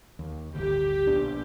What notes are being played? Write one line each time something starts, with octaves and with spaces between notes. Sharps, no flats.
D#2
D1 G1 D2 G4
A#1 B2 D4